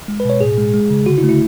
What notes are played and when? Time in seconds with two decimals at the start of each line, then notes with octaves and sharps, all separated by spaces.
0.08 G#3
0.20 B4
0.25 B2 C#5
0.41 A2 G#4
0.58 G#3
0.73 G#3
0.90 C#3
1.06 D3 F#4
1.18 E4
1.24 A3
1.29 E4